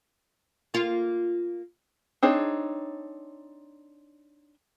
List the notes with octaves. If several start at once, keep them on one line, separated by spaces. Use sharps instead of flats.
A#3 F4
C4 D4 D#4 G#4 C#5